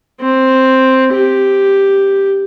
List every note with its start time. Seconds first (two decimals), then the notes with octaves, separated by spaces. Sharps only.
0.21 C4
1.13 G4